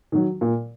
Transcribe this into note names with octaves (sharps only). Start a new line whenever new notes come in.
D#3 F#3
A#2